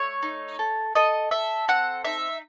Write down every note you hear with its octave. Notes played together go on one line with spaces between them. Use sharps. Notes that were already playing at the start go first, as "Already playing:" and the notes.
Already playing: A3 C#5
D#4
A4
A4 D#5
A4 E5
C4 F#5
D#4 E5